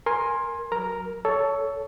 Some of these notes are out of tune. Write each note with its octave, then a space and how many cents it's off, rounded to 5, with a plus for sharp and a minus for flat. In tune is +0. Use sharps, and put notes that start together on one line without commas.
A#4 +0 G#5 +0 C6 +20
F#3 +0 A#4 +0 A#5 +0
A4 +0 C#5 +20